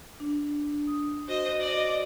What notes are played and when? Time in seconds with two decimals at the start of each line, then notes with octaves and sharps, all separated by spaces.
0.20 D4
0.87 D#6
1.28 F#4 C5 D#5
1.60 D5 D#5